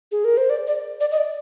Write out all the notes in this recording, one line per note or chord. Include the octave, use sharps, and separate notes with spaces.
G#4
A#4
C5
D5
D5
D5
D#5
D5